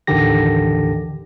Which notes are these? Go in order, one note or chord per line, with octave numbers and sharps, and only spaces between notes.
A1 D#2 D3 D#3 G4 A#6